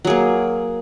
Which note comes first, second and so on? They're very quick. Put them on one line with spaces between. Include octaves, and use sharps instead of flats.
F#3 G#4 A#3